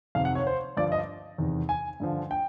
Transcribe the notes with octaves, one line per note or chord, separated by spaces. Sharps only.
F2 C3 D#3 F5
F#5
C#5
C5
G2 D3 F3 D5
D#5
E2 C3 D#3
G#5
G2 D3 F3
G5